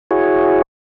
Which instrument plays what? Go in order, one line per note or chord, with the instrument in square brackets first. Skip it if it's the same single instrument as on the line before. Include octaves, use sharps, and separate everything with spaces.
[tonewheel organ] E4 F#4 G#4 C#5